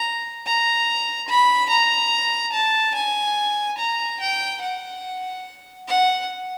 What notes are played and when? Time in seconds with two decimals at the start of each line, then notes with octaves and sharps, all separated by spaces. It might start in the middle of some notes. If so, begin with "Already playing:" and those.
Already playing: A#5
0.46 A#5
1.29 B5
1.70 A#5
2.53 A5
2.95 G#5
3.79 A#5
4.21 G5
4.62 F#5
5.88 F#5